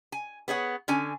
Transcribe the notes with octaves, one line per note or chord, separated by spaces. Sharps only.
G#5
B3 G#4 C#5 F#5
D3 C#4 G#5